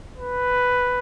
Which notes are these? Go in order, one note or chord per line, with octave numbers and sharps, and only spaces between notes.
B4